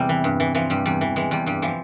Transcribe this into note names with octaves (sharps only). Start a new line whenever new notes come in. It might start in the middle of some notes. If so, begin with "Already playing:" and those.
Already playing: E2 C3 G3
E3
G2
E3
E3 F3
G2 G3
E2 G3
E3
E3 G#3
E2 G3
G2 G3
E3 F3